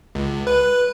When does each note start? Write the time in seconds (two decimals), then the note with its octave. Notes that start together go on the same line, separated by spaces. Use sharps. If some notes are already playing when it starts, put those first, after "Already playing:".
0.15 C#2
0.47 B4